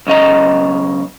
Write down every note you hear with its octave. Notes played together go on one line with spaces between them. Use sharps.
B1 C#3 D#5 A#5